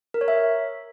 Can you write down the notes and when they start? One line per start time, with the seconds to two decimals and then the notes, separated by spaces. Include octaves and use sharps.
0.14 A#4
0.21 C#5
0.28 E5